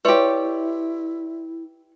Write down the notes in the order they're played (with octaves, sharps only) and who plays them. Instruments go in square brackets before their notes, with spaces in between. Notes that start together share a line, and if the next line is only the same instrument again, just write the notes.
[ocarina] E4 [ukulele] G4 C#5 [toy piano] B4 [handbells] D5 E5 C6